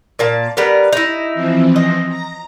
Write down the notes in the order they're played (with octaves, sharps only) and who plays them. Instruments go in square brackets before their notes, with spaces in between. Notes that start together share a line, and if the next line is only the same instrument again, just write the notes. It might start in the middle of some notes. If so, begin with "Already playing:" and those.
[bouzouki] A#2 A#3 A5
G3 B3 A#4
D#4 E4
[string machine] E3 F3 C4
[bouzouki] D#5
[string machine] A#5 A#6